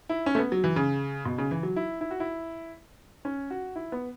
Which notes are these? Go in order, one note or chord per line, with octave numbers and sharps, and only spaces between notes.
E4
C#4
A3
B3
F#3
E3
C#3
B2
C#3
E3
F#3
E4
E4
F#4
E4
C#4
F#4
E4
B3